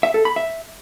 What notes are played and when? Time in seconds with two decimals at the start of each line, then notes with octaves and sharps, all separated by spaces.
0.03 E5
0.14 A4
0.25 B5
0.36 E5